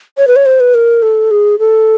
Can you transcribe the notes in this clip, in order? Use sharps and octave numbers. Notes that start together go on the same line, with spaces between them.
C#5
B4
C#5
C5
B4
A#4
A4
G#4
A4